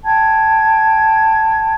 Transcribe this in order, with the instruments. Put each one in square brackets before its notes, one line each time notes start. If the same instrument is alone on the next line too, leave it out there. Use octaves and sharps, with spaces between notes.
[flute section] G5 A5 G#6